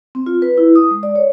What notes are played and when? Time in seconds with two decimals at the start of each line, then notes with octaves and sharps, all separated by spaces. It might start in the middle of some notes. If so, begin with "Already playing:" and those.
0.15 C4
0.26 F4
0.42 B4
0.58 E4
0.76 D#6
0.91 G#3
1.03 D5
1.15 C#5